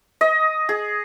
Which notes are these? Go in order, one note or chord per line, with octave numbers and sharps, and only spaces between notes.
D#5
G#4